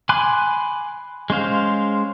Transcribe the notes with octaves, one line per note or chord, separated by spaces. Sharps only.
G#5 B5 C6 D6 F#6
G#3 C#4 C5 F5